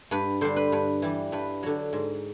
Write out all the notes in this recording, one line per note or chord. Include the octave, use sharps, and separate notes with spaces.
G2 B4
D3 G3 C5
B4
G2 B4
E3 G3
G2 B4
D3 F#3
G#2